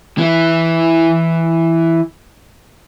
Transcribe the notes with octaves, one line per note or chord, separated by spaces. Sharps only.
E3 E4